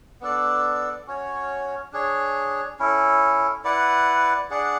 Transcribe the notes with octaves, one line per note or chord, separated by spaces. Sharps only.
B3 D4 A4 D5
C#4 F#4 C#5
D4 G#4 C#5
C#4 E4 A4
E4 B4 D5 F#5
D4 G#4 D5 F#5